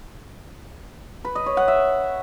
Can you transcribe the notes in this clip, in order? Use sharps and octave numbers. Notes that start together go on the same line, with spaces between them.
B4
D#5
C#5
F#5
E5